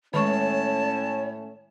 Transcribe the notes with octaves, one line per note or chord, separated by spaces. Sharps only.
A2 D#3 G#3 A3 C#4 C#5 A5 C#6